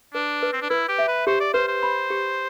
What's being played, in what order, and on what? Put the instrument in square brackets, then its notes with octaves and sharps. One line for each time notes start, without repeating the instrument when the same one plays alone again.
[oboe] D4 [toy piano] B4
[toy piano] B4
[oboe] C4
D4
[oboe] E4 [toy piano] B4
[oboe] G4
[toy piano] E5
[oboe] B4
[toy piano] G4 [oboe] C5
[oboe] D5
[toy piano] B4 [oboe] C5
[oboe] C5
[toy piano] B5
G4